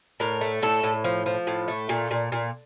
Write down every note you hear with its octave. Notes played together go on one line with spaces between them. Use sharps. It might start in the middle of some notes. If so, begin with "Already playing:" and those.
A2 A#4
A3
A2 A4
A2
F3
F3
A2
A3
A#2
A#2
A#2